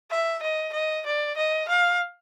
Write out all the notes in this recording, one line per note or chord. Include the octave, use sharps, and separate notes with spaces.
E5
D#5
D#5
D5
D#5
F5